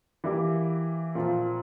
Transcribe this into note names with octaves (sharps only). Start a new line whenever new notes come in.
E3 A#3 E4 G4
A#2 F3 C4 F4